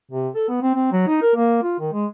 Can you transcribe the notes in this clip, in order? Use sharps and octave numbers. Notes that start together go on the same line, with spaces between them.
C3
A4
B3
C4
C4
F#3
D#4
A#4
A#3
F4
D#3
G#3